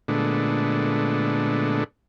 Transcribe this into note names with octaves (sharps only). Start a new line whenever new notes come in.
A#2 D3 G#3 A3 B3 D4